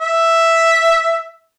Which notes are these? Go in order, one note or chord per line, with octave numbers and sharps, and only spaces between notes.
E5